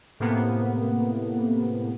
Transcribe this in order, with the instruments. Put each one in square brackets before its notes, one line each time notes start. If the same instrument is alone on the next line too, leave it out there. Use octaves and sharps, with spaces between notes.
[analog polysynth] A2 C3 A#3 B3